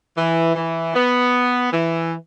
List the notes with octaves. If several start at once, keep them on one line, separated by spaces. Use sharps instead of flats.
E3
E3
B3
E3